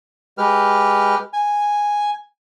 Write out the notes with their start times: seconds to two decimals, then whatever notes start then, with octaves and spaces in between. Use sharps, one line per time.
0.38 G#3 G4 B4 F6
1.33 G#5